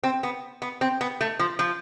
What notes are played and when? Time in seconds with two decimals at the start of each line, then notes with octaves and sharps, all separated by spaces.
0.04 C4
0.23 B3
0.62 B3
0.81 C4
1.01 B3
1.21 A3
1.39 F3
1.59 F3